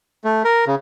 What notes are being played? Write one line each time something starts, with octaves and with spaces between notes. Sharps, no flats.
A3
A#4
C#3